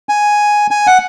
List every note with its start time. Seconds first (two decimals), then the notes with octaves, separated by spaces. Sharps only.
0.09 G#5
0.71 G#5
0.87 F#5